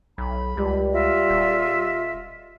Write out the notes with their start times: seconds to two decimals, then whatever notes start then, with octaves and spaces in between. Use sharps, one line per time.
0.18 B1 B5
0.57 C#2 G3
0.92 F4 D#5 E5
1.30 D#1